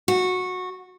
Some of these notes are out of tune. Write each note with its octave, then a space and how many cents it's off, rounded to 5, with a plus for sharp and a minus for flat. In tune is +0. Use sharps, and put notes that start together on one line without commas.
F#4 -15